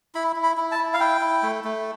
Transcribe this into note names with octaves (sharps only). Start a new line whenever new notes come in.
E4 B5
E4
B5
E4
A5
E4
F5
E4 G5
E4
A3
A3